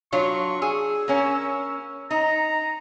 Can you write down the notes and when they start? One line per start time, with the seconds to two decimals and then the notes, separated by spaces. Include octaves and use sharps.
0.12 F#3 D4 F4 C#6
0.62 G#4 E6
1.08 A#3 C#4
2.11 D#4 A#5